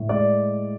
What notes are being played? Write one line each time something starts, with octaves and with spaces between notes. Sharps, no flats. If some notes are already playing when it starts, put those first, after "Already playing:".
Already playing: A2
G#3 D5